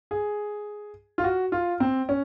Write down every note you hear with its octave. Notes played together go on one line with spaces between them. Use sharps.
G#4
F4
F#4
F4
C4
C#4